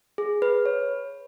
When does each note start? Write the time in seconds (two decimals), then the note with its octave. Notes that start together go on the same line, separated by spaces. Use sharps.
0.18 G#4
0.42 B4
0.66 C#5